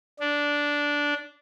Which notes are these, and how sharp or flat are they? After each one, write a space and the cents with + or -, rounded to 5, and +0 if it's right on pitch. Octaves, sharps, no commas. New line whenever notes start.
D4 -10